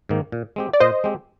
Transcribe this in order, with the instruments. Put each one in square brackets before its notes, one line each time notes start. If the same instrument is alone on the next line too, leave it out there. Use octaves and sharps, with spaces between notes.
[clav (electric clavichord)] G#2 D#3 A#3
A#2
G#3 C4 G4
[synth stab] D5
[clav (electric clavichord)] A#2 [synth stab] C5 D#5
[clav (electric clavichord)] G#3 C4 G4